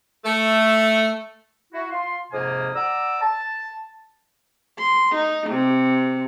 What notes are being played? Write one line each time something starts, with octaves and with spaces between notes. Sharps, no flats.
A3
E4 F#4
F4 C6
F2 G#2 C3 A#3 G#5 D#6
D5 F#5 A#5 D6 E6
A5
C6
D#4
C3